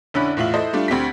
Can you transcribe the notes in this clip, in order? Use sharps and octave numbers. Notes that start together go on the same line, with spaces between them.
F1 D3 C#4 E4 B5 F#6
E2 A2 F4 E5 F#7
E4 A4 C5 D#5
G3 A3 D4 F4
D2 C4 G4 B6